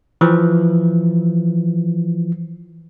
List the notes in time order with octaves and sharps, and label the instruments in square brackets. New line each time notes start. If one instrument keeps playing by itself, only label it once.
[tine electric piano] E3 F3